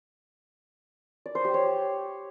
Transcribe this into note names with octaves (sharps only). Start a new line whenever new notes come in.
D5
C5
G4
C#5